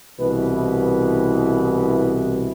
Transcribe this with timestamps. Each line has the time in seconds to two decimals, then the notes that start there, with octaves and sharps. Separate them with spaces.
0.19 C2 B2 E3 E4 B4